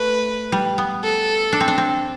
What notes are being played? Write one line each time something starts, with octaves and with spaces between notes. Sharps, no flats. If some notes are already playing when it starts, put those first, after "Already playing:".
Already playing: A3 B4
G3
B3
A4
D4
C4
D4
C4